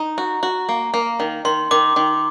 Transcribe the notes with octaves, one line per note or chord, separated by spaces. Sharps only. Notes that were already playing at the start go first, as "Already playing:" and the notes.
Already playing: D#4 A#5
F#4
F#4
A#3
A#3
D#3
D#3 C6
D#3 D6
D#3